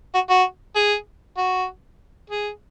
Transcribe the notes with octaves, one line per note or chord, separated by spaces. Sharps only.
F#4
F#4
G#4
F#4
G#4